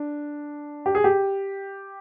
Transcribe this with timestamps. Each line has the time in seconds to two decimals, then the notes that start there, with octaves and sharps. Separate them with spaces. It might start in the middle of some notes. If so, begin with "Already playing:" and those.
Already playing: D4
0.86 G4
0.95 G#4
1.04 G4